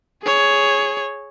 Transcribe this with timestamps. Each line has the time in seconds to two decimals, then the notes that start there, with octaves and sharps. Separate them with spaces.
0.23 G#4 C#5